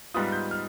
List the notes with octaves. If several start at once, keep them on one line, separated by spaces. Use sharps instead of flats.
G#2 G3 B3 F4 D#6
G6
F6